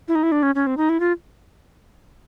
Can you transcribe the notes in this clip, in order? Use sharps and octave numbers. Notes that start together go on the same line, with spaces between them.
E4
D#4
E4
D4
C#4
C#4
C4
D#4
E4
F4